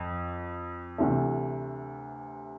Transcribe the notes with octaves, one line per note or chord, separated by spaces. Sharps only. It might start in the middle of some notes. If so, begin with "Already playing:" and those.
Already playing: F2
D2 C3 E3 A3